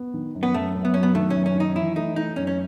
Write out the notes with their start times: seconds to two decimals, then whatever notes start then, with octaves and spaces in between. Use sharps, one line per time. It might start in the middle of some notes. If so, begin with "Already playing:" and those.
Already playing: B3
0.14 D#3
0.35 F#2
0.43 B3
0.54 F#2 A3
0.75 F#2
0.85 B3
0.94 F#3 C#4
1.03 B3
1.15 D#3 A3
1.30 F#2 C#4
1.46 C#4
1.55 D#3 D#4
1.76 E3 E4
1.96 A3 D#4
2.16 A3 D#4
2.36 F#2 C#4
2.47 C#4